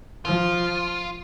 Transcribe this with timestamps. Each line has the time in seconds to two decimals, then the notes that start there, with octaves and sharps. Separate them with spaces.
0.25 F3 F4